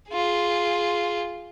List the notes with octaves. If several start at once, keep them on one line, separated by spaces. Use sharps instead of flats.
F4 G#4